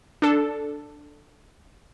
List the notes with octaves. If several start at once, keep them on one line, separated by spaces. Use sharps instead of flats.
D4 A4